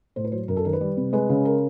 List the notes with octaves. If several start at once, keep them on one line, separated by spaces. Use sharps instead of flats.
A2 C5
B4
F#3 C5
F#2 A#4
A4
D#3 A#4
B4
G3
C3
G#3 B4
C#3
A#4